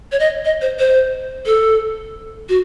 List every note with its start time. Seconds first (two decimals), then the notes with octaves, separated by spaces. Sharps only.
0.12 C#5
0.20 D#5
0.45 D#5
0.62 C5
0.79 C5
1.46 A4
2.49 F#4